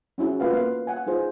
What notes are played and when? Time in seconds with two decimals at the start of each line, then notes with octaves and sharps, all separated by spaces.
0.18 C4 C#4 E4 F#4 G#4
0.40 A#3 F4 B4 F5 F#5
0.53 A#3 B3 F5
0.87 F5 F#5 G#5
1.06 D#4 F4 G#4 C5